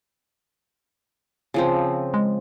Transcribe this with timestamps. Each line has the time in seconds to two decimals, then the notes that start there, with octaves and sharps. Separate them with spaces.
1.54 C#3 F3 C4
2.14 G#3